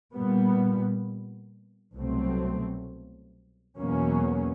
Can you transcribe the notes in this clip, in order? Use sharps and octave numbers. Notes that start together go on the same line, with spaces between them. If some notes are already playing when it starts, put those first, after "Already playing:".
A#2 G3 B3
C2 B2 F#3 A3 C4
E2 B2 F#3 A#3 C#4